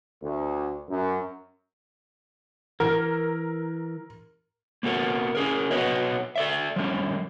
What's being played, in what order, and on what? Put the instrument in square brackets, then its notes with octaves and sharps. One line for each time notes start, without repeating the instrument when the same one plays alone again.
[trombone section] D2
F#2
[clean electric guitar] E3 [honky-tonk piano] A#4
[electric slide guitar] A#3 B3 F#4 A4 A#4
C#4 G#4 A#4
B3 F#4 A4 B4 C#5 D#5
A4 D5 E5
F3 G3 A3 C#4